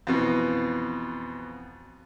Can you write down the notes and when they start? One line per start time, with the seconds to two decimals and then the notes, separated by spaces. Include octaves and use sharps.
0.07 F2 B2 E3